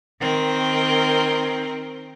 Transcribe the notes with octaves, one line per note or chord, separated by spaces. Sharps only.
D#3 C4 A#4